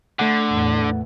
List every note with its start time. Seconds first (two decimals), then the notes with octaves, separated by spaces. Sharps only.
0.19 D3 A3 F#5
0.51 E2 A2 E3